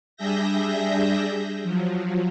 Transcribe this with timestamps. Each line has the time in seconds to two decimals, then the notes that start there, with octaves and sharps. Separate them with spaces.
0.17 G3 D4 G#4 E5 G6 A#6
1.64 F3 F#3